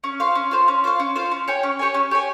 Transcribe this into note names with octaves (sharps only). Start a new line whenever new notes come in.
C#4
F4 C5 F5
C#4
F4 C5 F5
C#4
F4 C5 F5
C#4
F4 C5 F5
C#4
G4 C#5 G#5
C#4
G4 C#5 G#5
C#4
G4 C#5 G#5